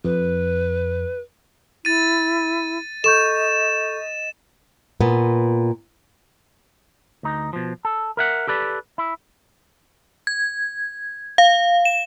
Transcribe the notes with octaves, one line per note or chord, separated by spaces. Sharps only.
F2 B4
E4 A6 D#7
A4 D#5 C#6 G6 E7
A#2 B3
D2 D#4
B2 F3
A4
A#4 E5 F#5
G4 A4 B4 D5
E4
G#6
F5
E7